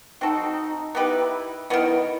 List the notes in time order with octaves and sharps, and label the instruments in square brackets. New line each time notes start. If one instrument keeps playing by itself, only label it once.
[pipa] F#3 C4 F#4 A4 [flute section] D#4
[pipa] B3 D#4 G4 B4 [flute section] E4
[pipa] D#3 F#3 B3 [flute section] E4